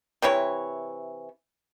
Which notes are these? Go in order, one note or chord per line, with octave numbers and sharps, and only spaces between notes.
C3 E3 E4 C#5